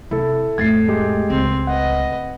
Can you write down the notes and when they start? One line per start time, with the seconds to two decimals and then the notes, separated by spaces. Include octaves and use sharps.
0.11 C3 E4 A4
0.58 F2 A2 A3 G#6 A6 C7
0.88 G#3 G4
1.30 C#2 C4
1.67 B4 D#5 F#5